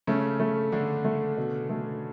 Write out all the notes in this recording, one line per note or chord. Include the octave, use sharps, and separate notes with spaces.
C#3 A3 C#4
A3
D3 A3 D4
A3
B2
A3